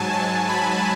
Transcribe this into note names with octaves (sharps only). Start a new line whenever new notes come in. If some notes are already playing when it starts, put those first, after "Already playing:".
Already playing: G#2 F#3 G#5 A5
A5
B5